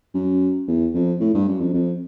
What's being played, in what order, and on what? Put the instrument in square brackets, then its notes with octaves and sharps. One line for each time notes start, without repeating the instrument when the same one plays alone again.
[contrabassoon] F#2
E2
F2
A2
G2
F#2
F2
F2